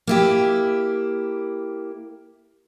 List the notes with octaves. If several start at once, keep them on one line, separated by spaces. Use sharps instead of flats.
A#3 E4 G4